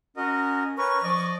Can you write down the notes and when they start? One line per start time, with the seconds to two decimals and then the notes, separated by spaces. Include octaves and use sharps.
0.17 C#4 F#4 A#4 D#5
0.78 C#4 A#4 B4 C#6
1.03 F3 D5 D#5